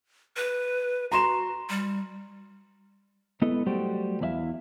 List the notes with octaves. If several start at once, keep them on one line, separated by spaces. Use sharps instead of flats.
B4
F#4 A#5 C6 E7
G3
G#3 B3 E4 A4 B4 D#5
F#3 G3 A3 F#4 G4 C5
E2 E3 E4 D5 E5 F5